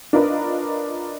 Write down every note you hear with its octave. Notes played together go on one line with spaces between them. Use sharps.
D4 F4 A#4 B4 D#5